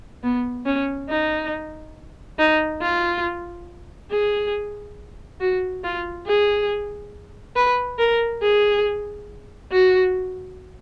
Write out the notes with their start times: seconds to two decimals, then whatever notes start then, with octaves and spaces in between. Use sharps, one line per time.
0.23 B3
0.65 C#4
1.09 D#4
2.38 D#4
2.82 F4
4.10 G#4
5.40 F#4
5.84 F4
6.27 G#4
7.56 B4
7.99 A#4
8.42 G#4
9.72 F#4